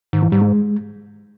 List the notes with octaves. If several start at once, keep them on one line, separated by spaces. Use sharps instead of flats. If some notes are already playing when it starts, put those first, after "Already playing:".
G#2 D#3
E3
G#2 G3
G#3